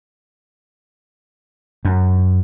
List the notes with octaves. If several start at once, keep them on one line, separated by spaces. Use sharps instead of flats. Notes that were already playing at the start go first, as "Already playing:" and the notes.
F#2